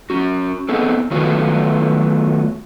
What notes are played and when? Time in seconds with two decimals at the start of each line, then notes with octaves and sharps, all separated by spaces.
0.10 C#4 F#4
0.69 B3 C4 D#4 G#4 A4
1.11 D#3 F#3 A3 B3 F4 F#4